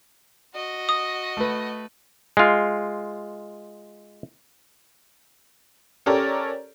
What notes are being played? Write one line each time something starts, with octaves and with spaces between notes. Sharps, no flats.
F#4 D#5
D#6
A3 B4
G#3 F4
C#4 G4 A4 A#4 C#5 D5